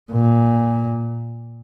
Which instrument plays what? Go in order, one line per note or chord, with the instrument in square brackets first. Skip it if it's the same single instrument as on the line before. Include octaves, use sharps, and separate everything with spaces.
[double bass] A#2